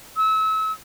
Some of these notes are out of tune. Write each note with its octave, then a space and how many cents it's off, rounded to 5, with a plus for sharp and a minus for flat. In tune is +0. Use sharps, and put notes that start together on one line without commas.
E6 -30